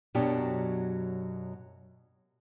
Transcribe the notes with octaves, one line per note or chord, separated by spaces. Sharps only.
F#2 B2 F#3 D4 G4